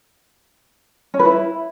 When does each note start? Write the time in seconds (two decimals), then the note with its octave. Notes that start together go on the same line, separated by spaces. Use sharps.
1.14 C#4
1.19 B4
1.25 E4